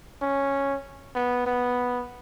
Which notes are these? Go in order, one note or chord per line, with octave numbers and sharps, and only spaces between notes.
C#4
B3
B3